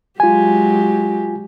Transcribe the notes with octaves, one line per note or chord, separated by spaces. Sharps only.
F#3 G#3 F4 G4 G#5